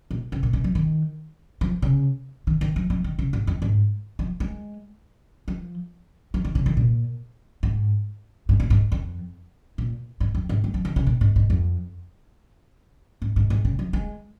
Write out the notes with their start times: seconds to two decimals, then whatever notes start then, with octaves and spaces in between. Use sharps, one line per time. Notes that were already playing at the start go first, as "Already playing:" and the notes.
0.11 A#2
0.32 C#3
0.43 A#2
0.53 C#3
0.64 F3
0.75 D#3
1.61 F3
1.82 C#3
2.47 D#3
2.61 D#3
2.76 F3
2.90 F3
3.04 D#3
3.19 C#3
3.33 G#2
3.47 F2
3.62 G#2
4.19 F3
4.40 G#3
5.48 F3
6.34 F3
6.45 D#3
6.55 C#3
6.66 D#3
6.77 A#2
7.63 G#2
8.49 G#2
8.60 A#2
8.70 G#2
8.92 F2
9.78 A#2
10.20 G#2
10.35 F2
10.49 G#2
10.64 G#3
10.74 F3
10.85 D#3
10.96 C#3
11.07 A#2
11.21 G#2
11.36 G#2
11.50 F2
13.22 G#2
13.36 G#2
13.50 G#2
13.65 C#3
13.79 F3
13.93 G#3